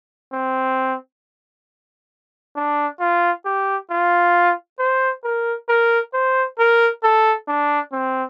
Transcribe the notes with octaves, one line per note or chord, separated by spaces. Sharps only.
C4
D4
F4
G4
F4
C5
A#4
A#4
C5
A#4
A4
D4
C4